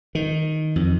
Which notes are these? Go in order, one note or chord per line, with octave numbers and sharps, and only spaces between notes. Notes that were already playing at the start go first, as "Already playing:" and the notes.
D#3
F2